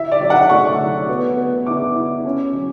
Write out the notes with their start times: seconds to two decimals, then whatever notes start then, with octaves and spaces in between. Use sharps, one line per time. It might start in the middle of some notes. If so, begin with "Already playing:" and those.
Already playing: E4 E5
0.12 D5
0.21 F#3
0.30 F#5
0.50 A3 C#6
0.79 F#3
1.09 B3
1.37 B3
1.66 E4 D6
1.96 E4
2.25 C#4
2.53 F#3